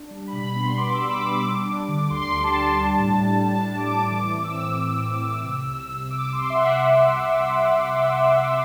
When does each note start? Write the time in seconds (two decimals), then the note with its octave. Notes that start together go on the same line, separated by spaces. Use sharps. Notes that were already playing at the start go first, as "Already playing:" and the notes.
Already playing: D4
0.10 G3
0.27 B5
0.33 B2
0.44 B5
0.55 B3
0.60 C6
0.77 B2 D6
0.94 E6
1.00 G3
1.11 D6
1.22 G3
1.27 D6
1.44 D4
1.66 D4
1.88 D3
2.10 D2 C6
2.33 G3
2.44 A5
2.55 G3
2.77 D4
3.00 A2
3.22 G3
3.44 D4 A5
3.66 G3
3.77 D6
3.89 A2
4.11 E3 D6
4.33 C4
4.44 E6
4.55 E3
4.78 C4
4.99 A2
5.21 C4
5.44 C3
5.66 C2
5.88 C2
6.10 C2 D6
6.33 C2 C6
6.50 E5
6.55 F#5